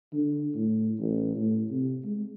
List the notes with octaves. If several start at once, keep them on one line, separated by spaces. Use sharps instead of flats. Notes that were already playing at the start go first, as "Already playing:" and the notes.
D3
A2
A1
A2
C3
G#3